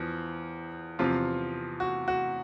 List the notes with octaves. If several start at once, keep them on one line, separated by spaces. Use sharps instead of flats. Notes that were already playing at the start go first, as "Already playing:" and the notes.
Already playing: E2 F3
E2 C3 F3 F4
F#4
F#4